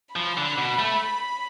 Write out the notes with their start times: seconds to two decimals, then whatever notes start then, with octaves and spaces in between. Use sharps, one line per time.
0.15 F3 B5
0.37 D3
0.58 B2
0.79 A3